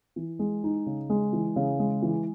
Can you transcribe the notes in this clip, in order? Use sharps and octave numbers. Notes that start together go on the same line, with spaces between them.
E3
G#3
D#4
C#3
G#3
E3
C#3
G#3
E3